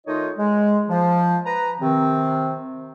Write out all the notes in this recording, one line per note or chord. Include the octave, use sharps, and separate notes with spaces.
D#3 A3 D#4 F4 C#5 D#5
G#3
F3
B4 A#5
C3 D#3 C4